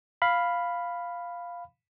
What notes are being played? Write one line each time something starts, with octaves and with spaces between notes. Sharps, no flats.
F5 B5